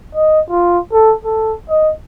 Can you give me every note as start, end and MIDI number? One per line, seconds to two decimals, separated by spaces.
0.15 0.40 75
0.50 0.79 65
0.93 1.15 69
1.25 1.54 69
1.70 1.91 75